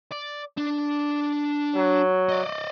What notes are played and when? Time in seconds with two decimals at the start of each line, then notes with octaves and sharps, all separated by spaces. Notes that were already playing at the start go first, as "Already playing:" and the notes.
0.12 D5
0.57 D4
1.76 F#3
2.29 D5 D#5